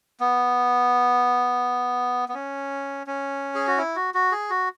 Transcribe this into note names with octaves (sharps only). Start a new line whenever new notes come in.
B3
B3
C#4
C#4
G#4
F#4
E4
F#4
F#4
G#4
F#4